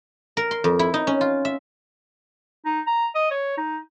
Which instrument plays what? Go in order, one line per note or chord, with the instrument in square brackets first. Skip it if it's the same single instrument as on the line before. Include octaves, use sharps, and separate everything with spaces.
[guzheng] A#4
C6
F2
E4
D#4
C#4
F4
E5
[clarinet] D#4
A#5
D#5
C#5
D#4